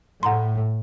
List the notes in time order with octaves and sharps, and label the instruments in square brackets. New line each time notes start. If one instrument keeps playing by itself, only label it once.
[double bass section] A2 [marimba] F#5 A#5 C6